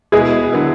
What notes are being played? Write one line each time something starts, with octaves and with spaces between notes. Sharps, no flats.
B2 G#3 B3 E4 G#4
D3 F#3 B3 E4